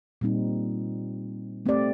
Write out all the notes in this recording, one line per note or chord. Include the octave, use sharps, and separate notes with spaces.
A#2 G3 C4 D#4
A3 C4 G4 D5